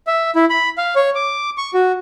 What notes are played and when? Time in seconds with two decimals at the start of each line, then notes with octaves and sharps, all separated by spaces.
0.07 E5
0.35 E4
0.50 B5
0.78 F5
0.96 C#5
1.15 D6
1.58 C#6
1.74 F#4